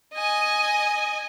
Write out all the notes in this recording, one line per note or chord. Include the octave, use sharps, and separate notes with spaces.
D#5 G#5